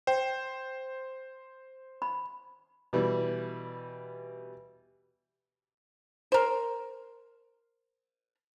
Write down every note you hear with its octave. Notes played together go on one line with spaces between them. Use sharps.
C5 G5
B5
B2 E3 G3
A#4 C5